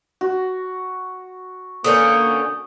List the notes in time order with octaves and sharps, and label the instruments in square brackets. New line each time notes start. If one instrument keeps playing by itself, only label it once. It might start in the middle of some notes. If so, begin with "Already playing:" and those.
[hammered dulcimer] F#4
[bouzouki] D3 B3 C#4 [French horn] A#3 [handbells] D#6 G6